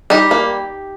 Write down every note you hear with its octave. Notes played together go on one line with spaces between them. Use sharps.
G3 D#4 G4
A#3